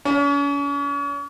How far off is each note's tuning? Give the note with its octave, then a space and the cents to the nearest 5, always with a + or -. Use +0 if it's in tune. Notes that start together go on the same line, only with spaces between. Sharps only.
C#4 +40